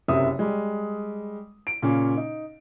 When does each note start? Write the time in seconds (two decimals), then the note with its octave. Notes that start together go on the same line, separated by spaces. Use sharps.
0.08 F#1 F#2 C3 E5 D#6
0.39 G3 G#3
1.67 D7
1.82 A#2 C#3 C#4
2.17 D#4